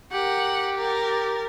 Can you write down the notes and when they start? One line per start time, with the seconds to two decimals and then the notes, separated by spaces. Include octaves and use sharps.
0.12 G4 A#4 F#5
0.76 A#4 A6